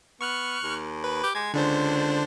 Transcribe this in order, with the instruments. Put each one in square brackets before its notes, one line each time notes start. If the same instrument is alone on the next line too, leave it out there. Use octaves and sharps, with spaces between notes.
[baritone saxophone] B3 [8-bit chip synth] C#6 F6 F#6
[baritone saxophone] D#2
[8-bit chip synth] B4
[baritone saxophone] G4
[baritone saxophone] G#3 [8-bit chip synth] G#6
[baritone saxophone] C#2 [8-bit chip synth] D3 D4 C5